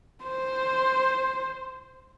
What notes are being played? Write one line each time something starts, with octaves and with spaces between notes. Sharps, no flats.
C5